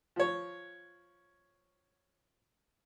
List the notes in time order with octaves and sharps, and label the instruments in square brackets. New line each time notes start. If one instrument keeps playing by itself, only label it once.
[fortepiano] F3 C#5